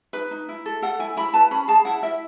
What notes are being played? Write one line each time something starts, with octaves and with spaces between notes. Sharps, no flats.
D#4 B4
D#4
E4
A4
A4 F#5
E4 G#5
E4 B5
B4 A5
C#4 B5
G#4 A5
E4 F#5
E4 E5